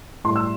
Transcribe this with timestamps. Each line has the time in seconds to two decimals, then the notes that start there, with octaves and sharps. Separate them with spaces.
0.24 A2 G3 C6
0.36 E6